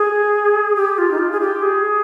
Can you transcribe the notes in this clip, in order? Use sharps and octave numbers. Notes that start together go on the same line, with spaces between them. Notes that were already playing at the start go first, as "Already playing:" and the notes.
Already playing: G#4
G4
F4
D#4
F4
G#4
G4
G#4